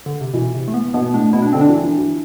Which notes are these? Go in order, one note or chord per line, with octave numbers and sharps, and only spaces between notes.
D3
C3
B2 E3
C3
A3
B3
B2 B3
A2 D4
B2 E4
D4
D3 C4
D4
E3
E3
E3